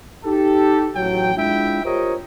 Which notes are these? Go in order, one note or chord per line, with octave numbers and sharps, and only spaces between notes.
D#4 G4 A4
A1 F#3 G5
G#3 D4 E4 F4 E5 G5
F4 G4 A#4 C5 C#5 D#5